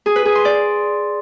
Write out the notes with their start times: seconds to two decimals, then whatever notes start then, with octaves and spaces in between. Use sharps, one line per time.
0.06 G#4
0.16 B4
0.25 G#4
0.35 C6
0.45 D5